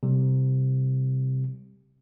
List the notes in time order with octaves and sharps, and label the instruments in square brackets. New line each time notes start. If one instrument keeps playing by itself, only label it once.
[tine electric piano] C3 G3